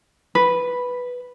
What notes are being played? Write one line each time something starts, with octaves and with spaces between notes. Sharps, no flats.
B4